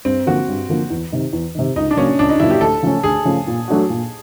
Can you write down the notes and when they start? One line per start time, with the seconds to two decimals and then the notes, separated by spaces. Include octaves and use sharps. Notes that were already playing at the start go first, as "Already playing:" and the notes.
0.05 G2 C4
0.26 D3 F3 A#3 F#4
0.48 G2
0.69 D3 F3 A#3
0.90 E2
1.12 C3 D#3
1.33 E2
1.55 C3 D#3
1.76 C#2 D#4
1.91 D4
1.97 C#3 F#3 A#3 C#4
2.19 C#2 D4
2.29 D#4
2.40 C#3 F#3 A#3 E4
2.51 G4
2.61 D2 A4
2.83 C#3 F3 A3 C#4
3.04 D2 G#4
3.25 C#3 F3 A3 C#4
3.47 A#2
3.68 F#3 A3 D4 F#4
3.90 A#2